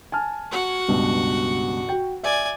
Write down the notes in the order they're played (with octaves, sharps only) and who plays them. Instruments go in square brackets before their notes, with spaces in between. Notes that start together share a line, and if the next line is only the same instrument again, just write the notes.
[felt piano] G#5 A5 F6
[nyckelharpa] F#4 F#5
[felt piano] C#2 G2 B2
F#4 G5
[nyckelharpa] D5 G#5 [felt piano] E5